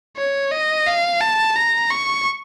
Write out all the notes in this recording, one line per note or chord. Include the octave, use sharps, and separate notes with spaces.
C#5
D#5
F5
A5
A#5
C#6